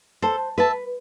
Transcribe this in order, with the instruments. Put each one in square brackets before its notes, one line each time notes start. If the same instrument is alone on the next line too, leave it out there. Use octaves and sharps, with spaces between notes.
[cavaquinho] A4 [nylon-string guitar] C5
[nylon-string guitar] B4 [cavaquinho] E5 A5